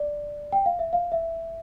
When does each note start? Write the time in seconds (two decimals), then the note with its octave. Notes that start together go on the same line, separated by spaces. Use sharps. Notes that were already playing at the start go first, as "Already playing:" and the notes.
Already playing: D5
0.52 G5
0.66 F5
0.79 E5
0.93 F5
1.12 E5